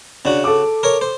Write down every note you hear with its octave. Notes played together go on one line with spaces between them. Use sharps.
C#3 D4 F#4
A4 D6
A#4 C#5
C5